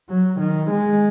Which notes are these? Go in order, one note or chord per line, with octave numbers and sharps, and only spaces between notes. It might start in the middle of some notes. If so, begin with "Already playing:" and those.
F#3
D#3
G#3